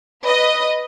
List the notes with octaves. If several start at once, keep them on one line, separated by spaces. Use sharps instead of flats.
B4 D#5